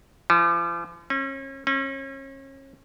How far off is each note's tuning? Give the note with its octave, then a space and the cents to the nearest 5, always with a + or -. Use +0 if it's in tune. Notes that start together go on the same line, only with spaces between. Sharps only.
F3 -45
C#4 -35
C#4 -35